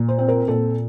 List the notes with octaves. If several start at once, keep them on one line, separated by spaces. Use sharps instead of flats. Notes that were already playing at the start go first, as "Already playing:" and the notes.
Already playing: A#2
C5
C4
A#4
A#2 A4